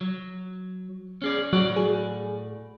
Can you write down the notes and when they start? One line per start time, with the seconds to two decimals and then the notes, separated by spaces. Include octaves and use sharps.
0.01 F#3
1.22 C#4 G#4 D5
1.53 A2 F#3 D5 F#5
1.76 G#4